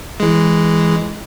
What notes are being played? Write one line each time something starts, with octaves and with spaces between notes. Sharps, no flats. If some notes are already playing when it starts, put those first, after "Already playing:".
E3 G#3